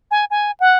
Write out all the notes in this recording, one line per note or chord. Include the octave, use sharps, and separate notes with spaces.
G#5
G#5
F#5